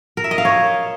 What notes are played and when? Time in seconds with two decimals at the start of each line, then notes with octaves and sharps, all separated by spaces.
0.17 A#4
0.24 E5
0.31 D#5
0.38 F5
0.45 C#5